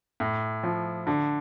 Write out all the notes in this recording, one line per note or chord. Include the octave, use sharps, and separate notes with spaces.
A2
F3
D3